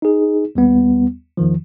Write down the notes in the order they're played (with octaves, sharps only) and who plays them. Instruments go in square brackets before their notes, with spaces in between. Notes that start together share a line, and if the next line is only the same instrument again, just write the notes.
[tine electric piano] D#4 G#4
D#2 G3 B3
E2 D#3 F3